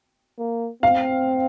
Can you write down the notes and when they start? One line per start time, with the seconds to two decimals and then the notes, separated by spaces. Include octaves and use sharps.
0.39 A#3
0.83 C4 F5